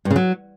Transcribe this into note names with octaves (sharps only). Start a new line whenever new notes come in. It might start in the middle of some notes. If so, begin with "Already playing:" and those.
G2
C#3
F#3